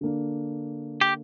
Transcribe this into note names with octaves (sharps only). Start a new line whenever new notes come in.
D3 A#3 D4
G4